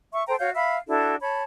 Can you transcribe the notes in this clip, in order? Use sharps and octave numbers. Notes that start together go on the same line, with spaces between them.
E5 C#6
A4 C5 G5 A#5
F#4 C#5 F5 G6
E5 F5 B5
D4 E4 F#4 A4
C#5 A5 B5